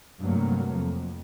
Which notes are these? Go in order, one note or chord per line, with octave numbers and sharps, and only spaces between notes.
G2 C3 F#3 A3 A#3
F2